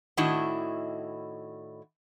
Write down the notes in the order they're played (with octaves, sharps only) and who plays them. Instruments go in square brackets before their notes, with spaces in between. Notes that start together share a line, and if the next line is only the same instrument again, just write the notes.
[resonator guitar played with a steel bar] A2 D#3 D4 E4 F#4 D#5